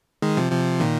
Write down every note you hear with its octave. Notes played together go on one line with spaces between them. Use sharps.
D#3 G#3
C3 F3
C3 F3
A#2 D#3